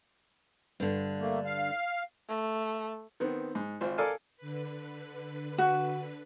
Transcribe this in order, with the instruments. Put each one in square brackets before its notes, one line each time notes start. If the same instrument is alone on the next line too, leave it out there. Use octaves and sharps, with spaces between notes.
[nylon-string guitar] G2 D3
[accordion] A3 A#3
F5
[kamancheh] A3
[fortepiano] D#3 B3 C4
G#2
G#1 F4 C5
A4 A#4 D5 F5 G#5 A5
[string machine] D3 B4
[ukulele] F#4